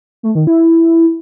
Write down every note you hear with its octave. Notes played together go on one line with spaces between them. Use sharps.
A3
D#3
E4